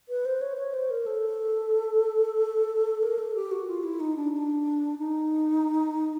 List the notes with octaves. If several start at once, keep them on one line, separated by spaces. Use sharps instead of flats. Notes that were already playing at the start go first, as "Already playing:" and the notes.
B4
C5
C#5
C#5
C5
A#4
A4
A#4
A4
G4
F#4
F4
E4
D#4
D4
D4
D#4